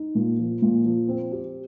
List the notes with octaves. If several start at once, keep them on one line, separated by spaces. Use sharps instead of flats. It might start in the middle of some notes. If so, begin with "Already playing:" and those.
Already playing: D#4
A#2
F3
A#2
F3
C4
G4